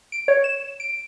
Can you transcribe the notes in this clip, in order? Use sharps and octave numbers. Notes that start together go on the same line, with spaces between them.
D7
C#5
E7
D7